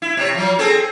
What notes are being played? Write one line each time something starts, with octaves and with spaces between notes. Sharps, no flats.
E4
C3 C#5
F3 F#3
C4 G#4 A4